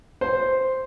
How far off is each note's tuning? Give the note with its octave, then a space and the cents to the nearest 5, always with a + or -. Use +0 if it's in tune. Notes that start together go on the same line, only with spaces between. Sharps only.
C5 +0